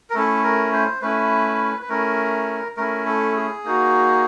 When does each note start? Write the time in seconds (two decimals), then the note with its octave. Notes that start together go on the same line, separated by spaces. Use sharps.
0.10 A#4
0.14 A3 C#4 E4 A4
0.43 A#4
0.73 C5
1.02 A3 C#4 E4 B4
1.82 B4
1.89 A3 C#4 E4 A#4
2.77 A3 C#4 E4 A#4
3.06 A4
3.35 G#4
3.64 A#3 D#4 F#4